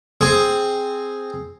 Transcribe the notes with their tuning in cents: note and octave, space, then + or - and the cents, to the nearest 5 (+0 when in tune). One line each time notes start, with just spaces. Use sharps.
C4 +0 G#4 +0